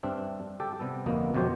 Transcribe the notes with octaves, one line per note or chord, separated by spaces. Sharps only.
G2 C4 D4 E5
G4 A4 G5
C3 G3 B3 A4
G1 F2 A#3 B3 D#5
G1 F2 B2 F#3 G4 C5